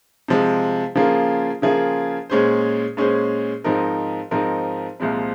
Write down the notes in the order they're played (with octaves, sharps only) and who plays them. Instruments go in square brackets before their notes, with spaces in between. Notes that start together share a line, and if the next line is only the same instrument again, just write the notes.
[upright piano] C3 F3 G#3
C#3 F3 A#3 F4 G#4
C#3 F3 A#3 F4 G#4
A#2 G#3 C#4 G#4 C5
A#2 G#3 C#4 G#4 C5
G#2 F3 C4 D#4 A#4
G#2 F3 C4 D#4 A#4
C2 A#2 F3 G#3 C4